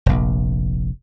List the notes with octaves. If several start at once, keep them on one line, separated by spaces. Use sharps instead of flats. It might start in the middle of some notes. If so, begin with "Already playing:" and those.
F1 A#1